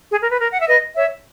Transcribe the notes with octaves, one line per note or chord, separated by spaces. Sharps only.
G#4
A#4
B4
A#4
F#5
E5
B4 D#5
C#5 E5